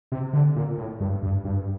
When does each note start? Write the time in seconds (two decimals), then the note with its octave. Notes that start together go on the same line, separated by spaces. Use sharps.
0.12 C3
0.33 D3
0.56 A#2
0.78 A2
1.01 G2
1.23 G2
1.45 G2